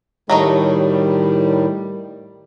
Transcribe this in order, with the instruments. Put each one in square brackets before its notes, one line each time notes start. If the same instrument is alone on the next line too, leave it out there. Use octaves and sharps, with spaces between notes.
[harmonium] A2 D#3 [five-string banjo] F#3 A3 D#4 [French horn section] G3